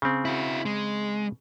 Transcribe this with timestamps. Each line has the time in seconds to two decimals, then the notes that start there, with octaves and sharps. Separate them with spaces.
0.02 C#3 C4
0.25 E4 F#4
0.65 G#3